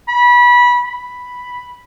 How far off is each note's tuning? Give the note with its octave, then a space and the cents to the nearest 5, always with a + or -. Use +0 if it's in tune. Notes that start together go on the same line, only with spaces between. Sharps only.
B5 -20
B5 +0